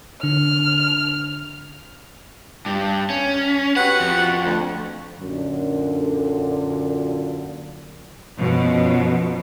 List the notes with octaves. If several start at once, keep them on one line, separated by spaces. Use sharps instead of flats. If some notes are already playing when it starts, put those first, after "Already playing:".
D3 F6
G2
C#4
F#4 G4 B4 F#5
F2
D2
F#2 A#2 D3
F#2 B2 F3